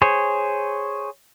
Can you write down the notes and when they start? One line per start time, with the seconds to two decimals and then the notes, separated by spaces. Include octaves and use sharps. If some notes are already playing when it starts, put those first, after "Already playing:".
0.02 G#4 C5 C#5